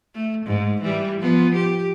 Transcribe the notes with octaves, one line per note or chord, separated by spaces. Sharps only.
A3
G#2
E3 G3
F3 B3
G4